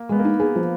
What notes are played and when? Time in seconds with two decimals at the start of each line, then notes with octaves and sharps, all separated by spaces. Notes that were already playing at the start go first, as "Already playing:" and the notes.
Already playing: A#3
0.09 G#3 B3
0.19 A#3
0.25 D#4
0.40 B3 G#4
0.55 F3